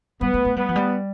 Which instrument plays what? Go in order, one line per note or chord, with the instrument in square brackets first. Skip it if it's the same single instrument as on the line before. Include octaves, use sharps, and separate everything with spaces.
[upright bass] G3 [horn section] B3
[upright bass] A3
A3
[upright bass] G3 [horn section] B3
[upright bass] F3
G3